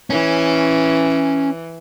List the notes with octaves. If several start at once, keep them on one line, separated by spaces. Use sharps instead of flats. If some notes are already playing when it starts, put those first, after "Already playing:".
E3 C#4